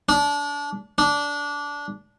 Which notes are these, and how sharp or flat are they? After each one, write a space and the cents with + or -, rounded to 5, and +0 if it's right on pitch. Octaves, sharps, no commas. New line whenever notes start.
D4 -25
D4 -15